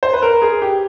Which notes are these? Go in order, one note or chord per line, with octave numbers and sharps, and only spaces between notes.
C5
B4
A#4
G#4
G4